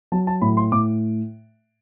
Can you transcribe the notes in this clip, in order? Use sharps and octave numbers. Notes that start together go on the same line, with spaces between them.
F#3 A5
A5
A2 B5
C6
A2 D6